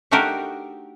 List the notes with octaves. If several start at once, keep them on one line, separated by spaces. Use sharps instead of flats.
A3 D4 D#4 F#4 G4 A#4